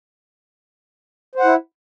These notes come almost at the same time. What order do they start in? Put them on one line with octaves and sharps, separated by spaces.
C5 F#5 E4